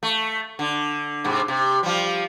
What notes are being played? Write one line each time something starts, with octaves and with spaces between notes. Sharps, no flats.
A3
D3
G#2 C3
C3
F3 G3